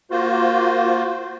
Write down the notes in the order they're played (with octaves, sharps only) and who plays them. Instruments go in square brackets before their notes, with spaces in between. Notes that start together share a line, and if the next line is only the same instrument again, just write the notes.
[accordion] A#3 F4 F#4 C5